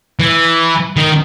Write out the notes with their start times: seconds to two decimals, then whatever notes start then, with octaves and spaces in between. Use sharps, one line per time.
0.20 E3
0.97 D#3